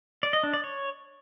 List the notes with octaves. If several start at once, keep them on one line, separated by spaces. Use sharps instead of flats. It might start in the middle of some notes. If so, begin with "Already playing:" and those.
D5
D#5
D4
D5
C#5